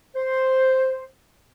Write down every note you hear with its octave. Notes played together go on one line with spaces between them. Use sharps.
C5